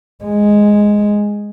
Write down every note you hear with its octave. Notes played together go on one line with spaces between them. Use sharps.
G#3